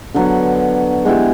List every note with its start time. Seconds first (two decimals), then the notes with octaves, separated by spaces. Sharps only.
0.14 D3 F#3 B3
1.05 G#3 B3 E4 G4